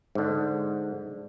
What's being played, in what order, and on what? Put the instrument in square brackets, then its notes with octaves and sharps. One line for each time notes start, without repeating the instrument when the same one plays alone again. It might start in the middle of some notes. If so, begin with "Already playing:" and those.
[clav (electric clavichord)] G#2 D3